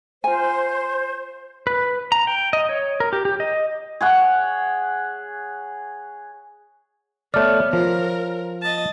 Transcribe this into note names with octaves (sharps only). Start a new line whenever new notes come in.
F4 C5 G#5
B4
A#5
G5
D#5
C#5
A#4
G4
G4
D#5
G#4 C#5 F#5
A3 B3 C#5 D5 F6
F3 A#4
D#5 A5